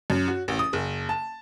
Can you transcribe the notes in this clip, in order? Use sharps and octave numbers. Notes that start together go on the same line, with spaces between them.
F#2
F#4
A1
D#6
F#1
A5